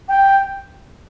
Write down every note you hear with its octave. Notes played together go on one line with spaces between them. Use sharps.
G5